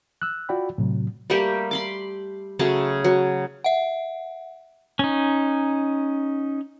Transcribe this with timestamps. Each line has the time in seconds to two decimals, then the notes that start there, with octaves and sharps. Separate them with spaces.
0.22 E6 F#6
0.49 F4 F#4 D5 G5 B5
0.78 A2 C3 F#3
1.30 G3 A3 A#3 G4
1.71 B5 C6 D6
2.59 C#3 F#3 A3 A5
3.04 F#3
3.64 E5 F#5
4.99 C#4 D#4